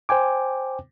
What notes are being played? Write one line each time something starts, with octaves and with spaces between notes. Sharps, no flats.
C5 G5 G#5 D6